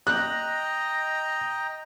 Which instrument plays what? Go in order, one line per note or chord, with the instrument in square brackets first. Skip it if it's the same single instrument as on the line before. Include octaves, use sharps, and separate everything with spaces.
[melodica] D#5 G5 A#5 [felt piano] F#6